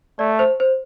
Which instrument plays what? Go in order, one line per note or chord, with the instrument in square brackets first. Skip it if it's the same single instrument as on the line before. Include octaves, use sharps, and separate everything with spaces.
[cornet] A3 [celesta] D5
[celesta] C5
C5